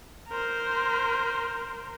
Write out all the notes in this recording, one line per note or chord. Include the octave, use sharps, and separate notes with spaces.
A#4 C5